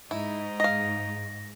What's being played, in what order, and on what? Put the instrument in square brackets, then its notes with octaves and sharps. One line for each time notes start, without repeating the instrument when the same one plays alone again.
[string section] G#2 [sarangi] D#4 [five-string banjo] E4
[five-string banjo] D#5 F5 [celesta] A#6